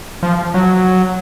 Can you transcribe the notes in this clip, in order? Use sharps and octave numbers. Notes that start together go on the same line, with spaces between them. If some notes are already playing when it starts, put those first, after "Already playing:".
F3
F#3